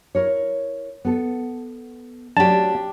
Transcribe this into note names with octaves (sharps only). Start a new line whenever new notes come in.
E4 A#4 C#5
B3 A4
F#3 A3 C#4 D4 G4 A5